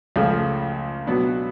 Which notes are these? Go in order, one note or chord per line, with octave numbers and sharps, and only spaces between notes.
C#2 C#3 F3 A3
B2 F#3 B3 D4